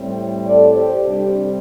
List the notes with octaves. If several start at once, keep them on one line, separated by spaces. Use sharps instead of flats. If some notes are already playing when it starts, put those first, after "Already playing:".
Already playing: A2 G3 C4
A4 D5
G4 C5
C3 G3 C4 D4 G4